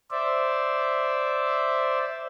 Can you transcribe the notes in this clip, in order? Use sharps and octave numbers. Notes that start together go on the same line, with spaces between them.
C5 D5 E5